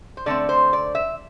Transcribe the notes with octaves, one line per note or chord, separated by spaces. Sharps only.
C5
D3 A3 C4 D5
C5
D5
E5